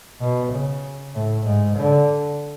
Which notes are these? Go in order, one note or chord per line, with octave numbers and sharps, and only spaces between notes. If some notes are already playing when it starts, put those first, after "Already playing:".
B2
C#3
A2
G#2
D3